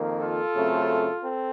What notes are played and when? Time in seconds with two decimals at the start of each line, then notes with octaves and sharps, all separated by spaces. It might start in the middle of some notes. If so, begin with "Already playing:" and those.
Already playing: F2 D#3 A#3
0.21 F4 A4
0.55 F#2 C#3 A3 C4
1.22 C4 A4